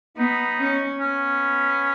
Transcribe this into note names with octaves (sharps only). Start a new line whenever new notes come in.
B3 D#4
C#4
B3 C#4